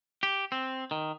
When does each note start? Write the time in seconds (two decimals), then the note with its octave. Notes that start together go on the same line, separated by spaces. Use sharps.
0.23 G4
0.52 C4
0.91 D#3